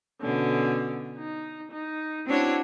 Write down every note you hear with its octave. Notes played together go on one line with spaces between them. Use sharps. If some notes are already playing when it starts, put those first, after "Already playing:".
B2 D3 C#4
D#4
D#4
C4 D4 E4 F#4 C#5